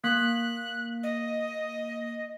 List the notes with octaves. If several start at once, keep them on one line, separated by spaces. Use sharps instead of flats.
A#3 F#6 B6
D#5